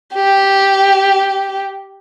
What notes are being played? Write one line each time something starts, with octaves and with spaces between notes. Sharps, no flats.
G4